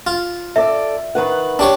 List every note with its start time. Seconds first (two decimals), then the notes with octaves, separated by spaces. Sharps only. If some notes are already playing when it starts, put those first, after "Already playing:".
0.07 F4
0.56 A4 D5 E5
1.15 D#3 B4 F#5
1.59 D4 G4 C#5